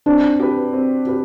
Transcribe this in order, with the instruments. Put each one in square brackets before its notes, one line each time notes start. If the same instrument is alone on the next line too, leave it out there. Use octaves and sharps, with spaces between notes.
[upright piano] C4 [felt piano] D4
[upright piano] G4 B4
C4
G4 B4